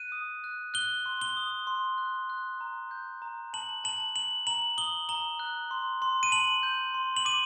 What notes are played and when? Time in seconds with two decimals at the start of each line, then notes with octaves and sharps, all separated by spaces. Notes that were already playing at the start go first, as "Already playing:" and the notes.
Already playing: F#6 D#7
0.12 D#6
0.44 F#6
0.74 F#6 G7
1.06 C6
1.21 G7
1.37 D#6
1.67 C6
1.98 F#6
2.30 F#6
2.61 A#5
2.91 G6
3.22 A#5
3.53 A5 F#7
3.84 A5 F#7
4.16 A5 F#7
4.47 A#5 F#7
4.78 D#6 G7
5.09 A#5 G7
5.40 F#6
5.71 C6
6.02 C6
6.23 D#7
6.32 A5 F#7
6.63 G6
6.94 C6
7.16 F#7
7.25 D6 D#7